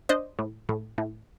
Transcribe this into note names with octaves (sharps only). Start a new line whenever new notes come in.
D4 C5 D#5
A2
A2
A2